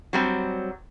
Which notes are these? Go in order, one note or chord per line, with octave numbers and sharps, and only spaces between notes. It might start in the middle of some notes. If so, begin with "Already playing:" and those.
F#3 G3 C4